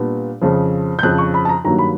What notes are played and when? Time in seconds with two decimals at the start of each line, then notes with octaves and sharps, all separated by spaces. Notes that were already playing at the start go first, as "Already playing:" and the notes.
Already playing: A#2 G3 B3 D4
0.42 F2 C#3 F3
0.99 G6
1.03 F2 C#3 F3 F#6
1.18 C#6
1.34 B5
1.45 A5
1.49 A#5
1.64 G2 D#3 F#3 A#3 A#5
1.78 B5